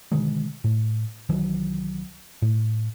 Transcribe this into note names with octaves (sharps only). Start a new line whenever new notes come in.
B2 D3 D#3 G#3
A2
C2 D#3 E3 F#3
A2